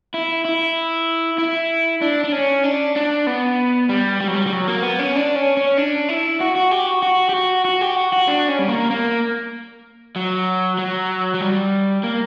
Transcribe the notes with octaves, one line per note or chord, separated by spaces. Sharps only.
E4
E4
E4
D4
D4
C#4
D4
D4
B3
G3
G3
F#3
G3
G3
F#3
A#3
B3
C#4
D4
C#4
C#4
D4
E4
F#4
F#4
G4
F#4
F#4
G4
F#4
F#4
G4
F#4
F#4
D4
C#4
G3
A#3
A#3
F#3
F#3
F#3
G3
A#3